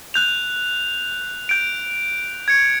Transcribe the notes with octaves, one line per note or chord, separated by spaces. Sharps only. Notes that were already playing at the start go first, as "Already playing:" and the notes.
F#6 G6 F7
G6 D7
G#6 C#7